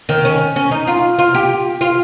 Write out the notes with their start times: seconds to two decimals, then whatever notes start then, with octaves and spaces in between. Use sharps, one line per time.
0.09 D#3
0.25 C#4
0.56 C#4
0.71 D#4
0.87 F4
1.19 F4
1.34 G4
1.81 F4